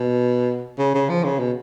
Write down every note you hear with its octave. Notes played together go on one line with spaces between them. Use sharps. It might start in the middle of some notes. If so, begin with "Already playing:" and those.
Already playing: B2
C#3
C#3
F3
C#3
B2